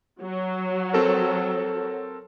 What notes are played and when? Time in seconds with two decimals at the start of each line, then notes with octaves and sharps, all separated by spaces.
0.22 F#3
0.93 C4 A4 A#4